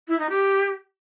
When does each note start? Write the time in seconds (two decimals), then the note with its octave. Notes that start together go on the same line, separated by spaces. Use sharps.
0.08 E4
0.19 D#4
0.30 G4